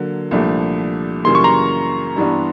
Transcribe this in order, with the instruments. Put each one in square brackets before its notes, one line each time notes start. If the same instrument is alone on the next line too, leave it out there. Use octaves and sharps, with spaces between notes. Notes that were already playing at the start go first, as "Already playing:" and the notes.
Already playing: [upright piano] D3 F#3 A#3
C2 A#2 F3 A3 D4
[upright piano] F#2 C#3 E3 G3 A#3 [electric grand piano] C6
[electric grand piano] C#6
A#5 C6
[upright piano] G2 E3 G3 B3 D4